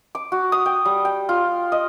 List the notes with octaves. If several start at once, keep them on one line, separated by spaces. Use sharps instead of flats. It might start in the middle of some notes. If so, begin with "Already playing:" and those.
D6
F#4
D#6
G5
G3
G5
F4
D#5